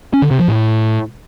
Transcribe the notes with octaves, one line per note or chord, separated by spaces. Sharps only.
C#4
D3
C3
F3
A2